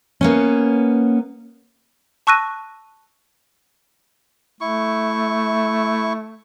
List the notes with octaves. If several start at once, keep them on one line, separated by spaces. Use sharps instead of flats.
A#3 B3 C#4
A5 C#6 E6 F#6 A#6 D#7
A3 E4 C#6